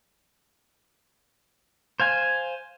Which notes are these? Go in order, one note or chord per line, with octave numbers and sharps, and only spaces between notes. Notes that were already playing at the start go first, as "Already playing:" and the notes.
C5 F5 G#5